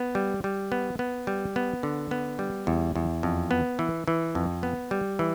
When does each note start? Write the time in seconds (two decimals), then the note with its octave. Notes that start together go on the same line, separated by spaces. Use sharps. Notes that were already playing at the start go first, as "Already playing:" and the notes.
Already playing: B3
0.15 G3
0.44 G3
0.72 B3
0.99 B3
1.27 G3
1.56 B3
1.83 D3
2.11 B3
2.39 G3
2.67 E2
2.96 E2
3.23 F2
3.51 B3
3.79 E3
4.08 E3
4.35 F2
4.63 B3
4.91 G3
5.19 E3